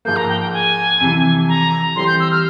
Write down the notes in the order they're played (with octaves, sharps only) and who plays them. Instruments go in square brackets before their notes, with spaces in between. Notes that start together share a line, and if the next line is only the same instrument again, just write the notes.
[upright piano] G#2 F3 A#3 [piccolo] G6
[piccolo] A#5
G5
G5
G#5
[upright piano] F2 C3 E3
[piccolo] A#5
[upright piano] E3 G3 C4 G4 [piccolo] C6
[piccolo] G6
E6
F6